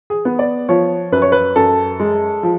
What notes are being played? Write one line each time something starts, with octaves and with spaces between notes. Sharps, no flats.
G#4
B3
D5
F3 C#5
F#2 B4
C#5
B4
F#2 A4
G#3
F3